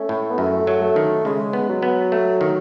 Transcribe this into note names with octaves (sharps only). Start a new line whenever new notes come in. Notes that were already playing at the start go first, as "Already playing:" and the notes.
Already playing: A3 C#4
A2
B3
F#2 A3
F#3
A3
D#3
C#3 G#3
B3
F#3
B3
A3
D#3